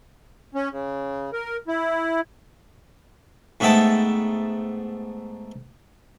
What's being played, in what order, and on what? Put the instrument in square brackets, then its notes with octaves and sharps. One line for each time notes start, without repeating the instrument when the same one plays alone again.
[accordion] C#4
C#3
A#4
E4
[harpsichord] G#2 A3 B3 E5 G5 A5